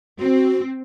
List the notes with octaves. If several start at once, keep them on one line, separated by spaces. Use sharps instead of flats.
C4 F#4